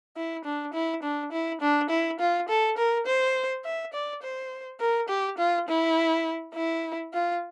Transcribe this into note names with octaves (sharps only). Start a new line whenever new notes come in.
E4
D4
E4
D4
E4
D4
E4
F4
A4
A#4
C5
E5
D5
C5
A#4
G4
F4
E4
E4
F4